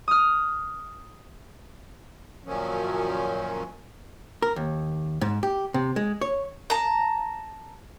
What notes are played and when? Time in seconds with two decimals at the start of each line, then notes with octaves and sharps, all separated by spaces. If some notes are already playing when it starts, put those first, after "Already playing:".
0.08 D#6 F6
2.43 F#2 A#2 D#3 F3 F#3 C#4
4.42 A#4
4.56 D#2
5.21 G#2
5.43 G4
5.74 C3
5.96 G#3
6.21 C#5
6.70 A5 A#5